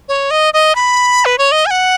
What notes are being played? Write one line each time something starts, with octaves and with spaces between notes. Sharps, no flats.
C#5
D#5
D#5
B5
B4
C#5
D#5
G#5
F#5